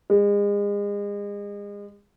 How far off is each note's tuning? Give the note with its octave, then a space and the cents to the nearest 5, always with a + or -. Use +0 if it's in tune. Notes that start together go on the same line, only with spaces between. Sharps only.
G#3 -35